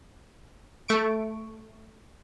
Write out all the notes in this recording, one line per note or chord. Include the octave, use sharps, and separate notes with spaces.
A3 C#6 D7